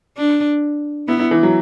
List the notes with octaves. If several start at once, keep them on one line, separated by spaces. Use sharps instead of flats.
D4
B3 E4
E4
E3
F#3